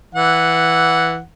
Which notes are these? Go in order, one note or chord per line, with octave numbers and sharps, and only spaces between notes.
E3 F#5